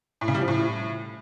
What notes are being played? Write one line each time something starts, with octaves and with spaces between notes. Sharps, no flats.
A2
C#3
G3
F3
A2